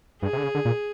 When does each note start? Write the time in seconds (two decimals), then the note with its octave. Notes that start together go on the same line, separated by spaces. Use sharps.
0.22 G2 G#4
0.33 C3
0.38 D3
0.43 C#3
0.54 D3
0.65 A#2